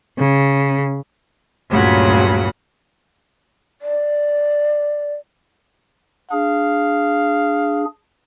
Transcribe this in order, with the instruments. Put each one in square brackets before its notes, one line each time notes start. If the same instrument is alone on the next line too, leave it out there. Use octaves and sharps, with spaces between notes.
[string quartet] C#3
D2 G2 A#2 C#3 F#3 F#5
[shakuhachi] D5
[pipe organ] D4 G#4 [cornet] F5